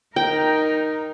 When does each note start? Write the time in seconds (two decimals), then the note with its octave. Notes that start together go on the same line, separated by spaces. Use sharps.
0.16 D#4 A#4 G5